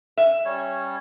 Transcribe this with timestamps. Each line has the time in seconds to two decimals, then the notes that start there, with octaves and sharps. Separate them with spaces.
0.18 E5
0.45 G3 C#4 C#5